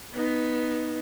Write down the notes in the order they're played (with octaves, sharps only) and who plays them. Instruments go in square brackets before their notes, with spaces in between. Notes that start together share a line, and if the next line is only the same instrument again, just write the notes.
[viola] B3 [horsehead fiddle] D#4